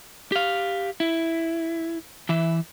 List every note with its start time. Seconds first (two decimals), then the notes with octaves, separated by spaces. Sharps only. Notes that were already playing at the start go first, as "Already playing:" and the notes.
0.32 G4 F5
1.00 E4
2.29 E3 E5